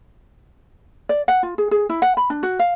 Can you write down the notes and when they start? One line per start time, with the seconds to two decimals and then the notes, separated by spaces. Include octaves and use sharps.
1.09 D5
1.28 F#5
1.43 F4
1.58 G#4
1.71 G#4
1.89 E4
2.02 F#5
2.17 B5
2.30 D4
2.43 F#4
2.59 F5